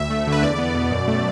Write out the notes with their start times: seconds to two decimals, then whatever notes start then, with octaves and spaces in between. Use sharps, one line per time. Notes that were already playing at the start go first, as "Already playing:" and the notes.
Already playing: D2 E5
0.10 A3
0.27 D3
0.32 B4
0.43 E2 D5
0.58 B3
0.75 B2
0.91 F#2
1.08 A3